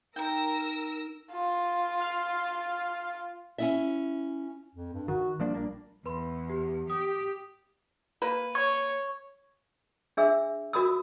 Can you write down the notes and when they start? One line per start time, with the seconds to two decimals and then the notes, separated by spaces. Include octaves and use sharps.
0.16 D#4 A#4 G5 A#5 E6 A#6
1.32 F4
2.00 F5
3.58 C#4 E4 E5
4.75 F2
4.93 G2
5.08 D#3 F#4
5.40 F3 G3 A#3 D4
5.54 A#1 A#3 D4
6.06 E2 B4 B5 C6
6.50 G4
6.90 G4 D#6
8.22 A#3 B4
8.55 C#5 C#6 G#6
10.17 D4 G#4 E5 E6
10.73 F#4 A#4 B5 D#6 E6